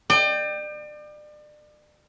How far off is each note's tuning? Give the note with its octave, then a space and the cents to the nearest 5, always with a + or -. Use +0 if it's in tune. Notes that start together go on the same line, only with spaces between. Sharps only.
D5 +35 G5 +0